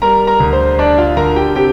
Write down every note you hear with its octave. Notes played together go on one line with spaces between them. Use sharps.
G3 A#4 A#5
A#4 A#5
D2
C5
D4 D5
F4 F5
D3 A#4 A#5
G4 G5
C3 G4 G5